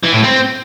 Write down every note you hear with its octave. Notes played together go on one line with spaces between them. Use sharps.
E3
A2
C4